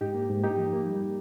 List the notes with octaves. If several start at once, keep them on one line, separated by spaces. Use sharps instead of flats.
G#2 D#4 G4
A#3
G#2
A#3 D#4 G4
F3
A#3
G3